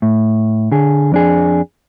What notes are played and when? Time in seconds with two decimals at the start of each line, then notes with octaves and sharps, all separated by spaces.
0.02 A2
0.71 D3 G#4
1.12 F2 D4 G#4